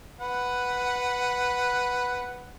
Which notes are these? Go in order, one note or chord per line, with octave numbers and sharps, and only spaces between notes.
B4 F#5